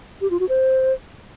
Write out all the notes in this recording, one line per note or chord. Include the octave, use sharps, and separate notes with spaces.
G4
F4
F#4
C5